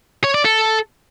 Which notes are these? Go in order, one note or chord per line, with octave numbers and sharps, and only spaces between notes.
C#5
D5
A4